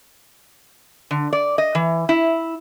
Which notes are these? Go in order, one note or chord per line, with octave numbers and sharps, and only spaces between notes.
D3
D5
D#5
E3
E4